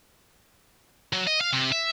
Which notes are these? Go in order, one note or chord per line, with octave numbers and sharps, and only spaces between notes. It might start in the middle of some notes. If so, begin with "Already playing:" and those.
F#3
D#5
F5
C3
E5